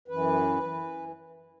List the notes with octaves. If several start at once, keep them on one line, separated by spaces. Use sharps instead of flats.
F#2 E3 B4
E3